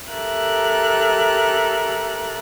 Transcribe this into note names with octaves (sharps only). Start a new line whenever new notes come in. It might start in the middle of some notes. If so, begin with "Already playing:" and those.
G4 A4 A#4 E5 F#6